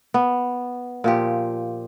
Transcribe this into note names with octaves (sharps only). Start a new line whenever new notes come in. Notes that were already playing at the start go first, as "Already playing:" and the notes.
B3
A#2 F3 G4